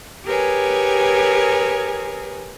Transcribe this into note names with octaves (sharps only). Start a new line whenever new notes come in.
G4 G#4 A#4 B4 C#5 G#5